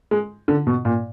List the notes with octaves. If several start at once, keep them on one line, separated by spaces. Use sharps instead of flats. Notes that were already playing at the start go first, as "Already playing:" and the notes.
G#3
D3
B2
A#2